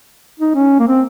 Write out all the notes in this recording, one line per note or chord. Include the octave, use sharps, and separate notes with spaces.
D#4
C#4
A#3
C4